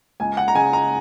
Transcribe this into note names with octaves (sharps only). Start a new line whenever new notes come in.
C#2 G#5
F#5
A#5
C#3 G#3 G#5
A#5